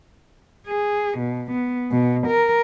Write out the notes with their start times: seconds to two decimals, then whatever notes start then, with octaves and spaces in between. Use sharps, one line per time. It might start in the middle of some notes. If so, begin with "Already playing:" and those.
0.67 G#4
1.18 B2
1.51 B3
1.91 B2
2.27 A#4